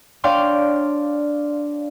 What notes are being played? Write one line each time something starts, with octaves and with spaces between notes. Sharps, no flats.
D4 C#5 D5 F5 G5 C6